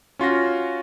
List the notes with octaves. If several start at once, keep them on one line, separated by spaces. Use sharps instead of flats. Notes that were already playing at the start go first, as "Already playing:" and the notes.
C#4 F4 F#4 A#6